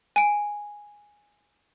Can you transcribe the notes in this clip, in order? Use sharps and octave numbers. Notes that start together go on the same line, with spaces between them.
G#5 D7